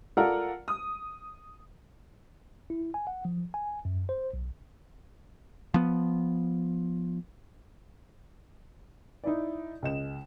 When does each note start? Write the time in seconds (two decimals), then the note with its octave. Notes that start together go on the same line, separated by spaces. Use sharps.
0.17 F4 A4 A#4 D5 F#5 A#5
0.68 D#6
2.70 E4
2.94 G#5
3.07 F#5
3.25 F3
3.54 G#5
3.85 F#2
4.09 C5
4.33 B1
5.74 F3 B3
9.24 D#4 E4 D5
9.82 C#2 D#5 E7